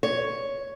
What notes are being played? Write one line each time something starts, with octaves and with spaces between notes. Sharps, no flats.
C#5